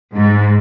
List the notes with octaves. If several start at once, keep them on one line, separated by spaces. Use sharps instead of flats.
G#2